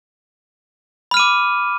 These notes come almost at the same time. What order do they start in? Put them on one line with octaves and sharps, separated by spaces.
B5 F6 D#7 D6